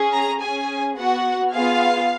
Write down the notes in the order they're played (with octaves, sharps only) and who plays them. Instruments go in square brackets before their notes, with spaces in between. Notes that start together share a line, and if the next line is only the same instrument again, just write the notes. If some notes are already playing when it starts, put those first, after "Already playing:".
Already playing: [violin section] C#4 G#4
A#5
C#4 G#4 G#5
B3 F#4 F#5
B3 F4 G#4 F5